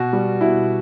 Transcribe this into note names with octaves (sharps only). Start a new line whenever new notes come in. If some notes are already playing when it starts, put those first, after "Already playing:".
Already playing: B2 F#4
G3
B2 E4